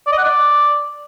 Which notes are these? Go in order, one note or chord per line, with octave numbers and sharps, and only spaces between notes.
D5
D#5
F#5
D5